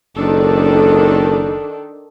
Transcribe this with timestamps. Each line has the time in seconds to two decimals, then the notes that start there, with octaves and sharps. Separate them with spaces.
0.15 F#1 D#3 D4 A4